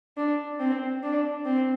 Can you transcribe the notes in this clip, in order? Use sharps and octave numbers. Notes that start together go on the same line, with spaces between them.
D4
C4
D4
C4